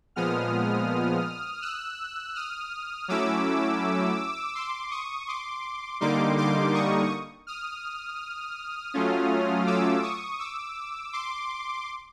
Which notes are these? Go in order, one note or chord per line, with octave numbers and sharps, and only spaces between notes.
A#2 F3 G#3 B3 D#6 F6
E6 F#6
D#6 F6
F#3 A3 C#4 E4 D6 E6
C6 D6
C#6 D#6
C6 D6
D3 G3 A#3 D#4 C6 D6
C6 D6
C#6 D#6
D#6 F6
F#3 A3 C#4 F4
D6 E6
C#6 D#6
D6 E6
C6 D6